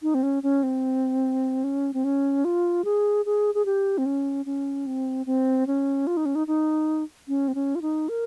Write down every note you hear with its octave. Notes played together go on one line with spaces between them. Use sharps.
D#4
C4
C#4
C#4
C4
C#4
C4
C#4
F4
G#4
G#4
G#4
G4
C4
C#4
C#4
C4
C4
C#4
F4
D#4
C#4
D#4
D#4
C#4
C4
C#4
F4
D#4
A#4